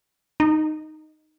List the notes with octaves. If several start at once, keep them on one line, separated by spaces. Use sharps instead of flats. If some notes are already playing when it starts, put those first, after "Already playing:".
D#4